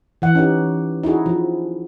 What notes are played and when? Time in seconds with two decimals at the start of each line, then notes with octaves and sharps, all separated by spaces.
0.22 E3 F#5
0.35 C#4 D#4 G4
1.03 D#4 E4 F#4 G#4
1.26 F3